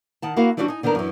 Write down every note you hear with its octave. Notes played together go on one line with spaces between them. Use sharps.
D#3 F#5 A5
A#3 E4 F#4 A#4 F5
E3 G3 C#4 D4 F4 F#4
D#4 G#5
D3 D#3 B3 D4 A#4
F#2 E3